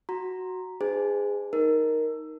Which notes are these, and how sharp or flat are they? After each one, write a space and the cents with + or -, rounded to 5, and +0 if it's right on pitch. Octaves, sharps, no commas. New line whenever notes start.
F#4 +0 A#5 +0
D4 +45 G#4 -15 C5 -45
D#4 +0 A#4 +0